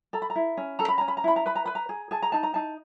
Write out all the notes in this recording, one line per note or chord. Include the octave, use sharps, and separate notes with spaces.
A4 A#5
B5
A#5
E4
C#4
A4 A#5
B5
C#4 A#5
B5
A#5
E4 B5
A#5
B4 B5
A#5
B4 B5
A#5
G#4
G#4 A5
A#5
D#4 A5
A#5
D#4 A5